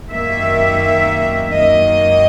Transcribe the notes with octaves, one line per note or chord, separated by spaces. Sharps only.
F#2 D#3 A#3 E5
F#2 D#3 A#3 D#5